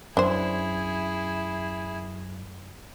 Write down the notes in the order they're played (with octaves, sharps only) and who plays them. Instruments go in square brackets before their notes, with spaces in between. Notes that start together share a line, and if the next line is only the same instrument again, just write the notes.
[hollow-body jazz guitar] F#2 [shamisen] D4 C5 [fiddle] E4 G#4